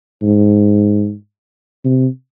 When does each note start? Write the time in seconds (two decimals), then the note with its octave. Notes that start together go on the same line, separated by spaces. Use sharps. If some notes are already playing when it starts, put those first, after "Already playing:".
0.22 G#2
1.84 C3